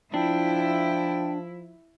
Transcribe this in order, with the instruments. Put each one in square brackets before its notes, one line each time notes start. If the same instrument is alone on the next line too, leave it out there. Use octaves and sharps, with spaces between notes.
[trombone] F3 [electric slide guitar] D4 [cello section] E4 [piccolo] G5